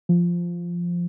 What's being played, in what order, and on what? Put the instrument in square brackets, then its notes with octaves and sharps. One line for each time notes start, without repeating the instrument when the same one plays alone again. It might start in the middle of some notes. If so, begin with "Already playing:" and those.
[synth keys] F3